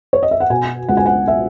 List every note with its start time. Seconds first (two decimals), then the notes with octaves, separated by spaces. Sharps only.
0.13 C#5
0.23 D#5
0.31 E5
0.40 F#5
0.50 B2 G#5
0.89 C#2 F#5
0.97 G#5
1.06 F#5
1.28 E5